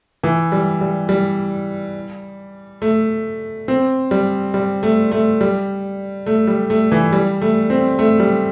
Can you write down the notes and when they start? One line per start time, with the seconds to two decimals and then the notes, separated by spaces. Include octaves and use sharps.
0.23 E3
0.52 G3
0.81 G3
1.09 G3
2.82 A3
3.68 C4
4.11 G3
4.54 G3
4.83 A3
5.12 A3
5.41 G3
6.26 A3
6.47 G3
6.70 A3
6.92 E3
7.13 G3
7.42 A3
7.70 C4
7.99 A3
8.20 G3